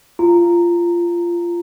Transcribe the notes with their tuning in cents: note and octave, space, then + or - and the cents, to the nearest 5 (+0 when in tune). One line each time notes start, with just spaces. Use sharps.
F4 -20 A#5 -10